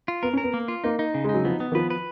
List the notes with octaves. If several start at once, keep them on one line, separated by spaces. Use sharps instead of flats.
F4
B3 A#4
C#4
A#4
B3
A#3
F4
A#3 D#4
D#4
C#3
G#3 D#4
F#3
F3 B3
B3
D#3
F3 B4
B4